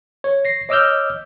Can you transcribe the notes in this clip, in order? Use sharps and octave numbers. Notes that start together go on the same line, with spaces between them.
C#5
A#6 C7
C#5 D#5 D6 E6 F6 G6